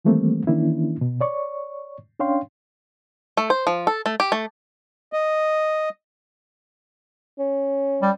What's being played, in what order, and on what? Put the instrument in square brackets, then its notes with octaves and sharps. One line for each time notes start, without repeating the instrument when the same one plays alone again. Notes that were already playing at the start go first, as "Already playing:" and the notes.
[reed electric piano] D#3 E3 G3 A3 A#3 C4
D#3 E3 A#3 C#4 D4 E4
B2
C#5 D5 C#6
C#4 D4 C#5 F5 G5 C6
[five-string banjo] A3
C5
F3
A4
A3
G4
A3
[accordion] D#5
[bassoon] C#4
[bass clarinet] G3